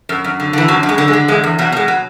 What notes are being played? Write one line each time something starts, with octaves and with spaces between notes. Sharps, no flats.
F#2
F#2
D3
D3 E3
F#2 F#3
F#2
G#3
D3
G#3
D3
E2 G#3
E2
B2 F#3
B2 G#3
F#3